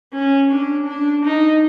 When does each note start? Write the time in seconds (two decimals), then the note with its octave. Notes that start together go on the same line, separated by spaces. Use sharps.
0.14 C#4
0.51 D4
0.87 D4
1.24 D#4